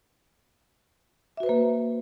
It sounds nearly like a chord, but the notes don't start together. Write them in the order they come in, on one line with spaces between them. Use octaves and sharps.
E5 F#4 B4 C5 A#3